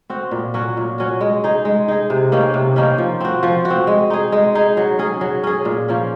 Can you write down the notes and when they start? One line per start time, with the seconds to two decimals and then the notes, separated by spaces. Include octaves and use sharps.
0.10 C4 F#4
0.31 A#2
0.54 F#3 C#4 F#4
0.77 A#2
0.98 F#3 C#4 F#4
1.21 G#3
1.44 D#4 G#4
1.65 G#3
1.88 D#4 G#4
2.10 C3
2.32 D#3 A#3 C#4
2.54 C3
2.76 D#3 A#3 C#4
2.98 F3
3.21 C4 F#4
3.43 F3
3.65 F#4
3.70 C4
3.87 G#3
4.10 D#4 G#4
4.32 G#3
4.55 D#4 G#4
4.77 F#3
4.99 C#4 G#4
5.21 F#3
5.43 C#4 G#4
5.65 A#2
5.88 F3 A#3 C#4